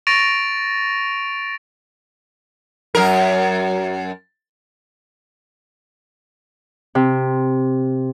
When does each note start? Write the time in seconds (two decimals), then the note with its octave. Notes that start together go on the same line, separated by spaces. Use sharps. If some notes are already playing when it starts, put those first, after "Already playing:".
0.07 C#6 A6 A#6 D7 F7
2.95 F#2 A#4
6.95 C3